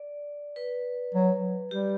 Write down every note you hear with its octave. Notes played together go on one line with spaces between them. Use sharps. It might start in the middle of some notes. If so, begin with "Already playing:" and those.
Already playing: D5
B4
F#3
G3 G4